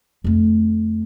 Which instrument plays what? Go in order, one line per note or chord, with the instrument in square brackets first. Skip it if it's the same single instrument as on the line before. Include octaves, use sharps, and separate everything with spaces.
[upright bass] F2 A3